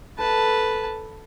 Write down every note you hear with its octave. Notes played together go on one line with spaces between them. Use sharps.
A4 B4 A5